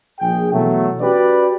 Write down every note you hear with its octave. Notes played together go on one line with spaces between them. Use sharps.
A#1 G#4 G5
B2 E3 F#3 A3
C#4 F#4 G4 B4 D5